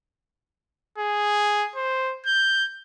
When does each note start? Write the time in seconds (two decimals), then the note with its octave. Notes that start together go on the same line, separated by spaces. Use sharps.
0.98 G#4
1.76 C5
2.26 G6